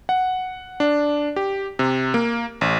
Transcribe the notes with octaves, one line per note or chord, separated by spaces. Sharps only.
F#5
D4
G4
C3
A#3
A1